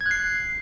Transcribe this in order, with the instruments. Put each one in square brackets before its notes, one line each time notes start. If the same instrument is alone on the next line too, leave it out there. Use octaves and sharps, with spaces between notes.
[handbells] G#6
F#6
C7